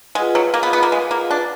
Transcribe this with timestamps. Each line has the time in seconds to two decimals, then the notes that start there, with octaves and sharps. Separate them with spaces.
0.15 G#3 F4 G#4 B4 D#5 F#5
0.35 F#3
0.54 A#3
0.63 B3
0.73 B3
0.83 A#3
0.92 G#3
1.11 A#3
1.31 D4